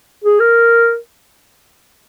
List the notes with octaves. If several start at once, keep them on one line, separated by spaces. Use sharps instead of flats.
G#4
A#4